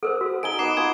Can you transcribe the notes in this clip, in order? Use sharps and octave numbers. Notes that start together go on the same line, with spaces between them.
A4 A#4 C5 F#5
F#4
D#4 G#5 A5 D7 G7
B3 D#4 F#5 D6 C7 E7
F4 G#5 D6 G#6